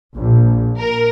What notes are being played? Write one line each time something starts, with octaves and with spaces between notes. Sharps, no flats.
A#1
A#4